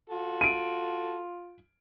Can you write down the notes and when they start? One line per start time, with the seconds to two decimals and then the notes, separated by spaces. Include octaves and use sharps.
0.09 F4 F#4 A4
0.41 D7 D#7